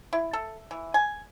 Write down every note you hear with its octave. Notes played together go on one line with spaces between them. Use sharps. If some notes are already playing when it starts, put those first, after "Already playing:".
E4
A4
E3
G#5